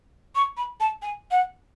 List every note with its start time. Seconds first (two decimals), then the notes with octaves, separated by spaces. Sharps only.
0.35 C#6
0.57 B5
0.80 A5
1.02 G#5
1.31 F#5